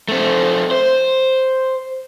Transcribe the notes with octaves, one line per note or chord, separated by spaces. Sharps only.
A3 C4
C5